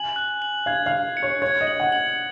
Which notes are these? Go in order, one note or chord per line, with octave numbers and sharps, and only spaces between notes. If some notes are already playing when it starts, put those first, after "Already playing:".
Already playing: G#5 F#7
F#6
F#7
F5 G#6
F5
F#7
C#7
C#5
C#5 G#6
D#5
F#7
F#5
F#7